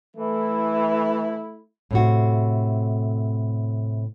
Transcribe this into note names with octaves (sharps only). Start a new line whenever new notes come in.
E3 A3 E4
A2 C3 F#4